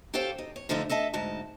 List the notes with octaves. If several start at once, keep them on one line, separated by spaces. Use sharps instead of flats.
G4 A4 C5 C#5 F5 G5
D#4
C#5
D3 F3 A3 D#4 F4
A4 D#5 E5 A5
D2 G#2 D#4 A5